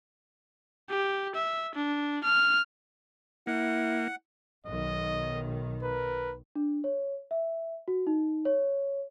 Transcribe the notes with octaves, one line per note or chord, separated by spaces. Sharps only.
G4
E5
D4
F6
A#3 E4 F#5
B1 D#3 D#5
A#4 B4
D4
C#5
E5
F#4
D#4
C#5